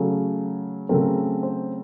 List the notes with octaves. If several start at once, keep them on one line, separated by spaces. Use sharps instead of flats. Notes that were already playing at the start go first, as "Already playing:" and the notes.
Already playing: C#3 F#3 A3
C#3 F#3 A3 C4 A#4
C5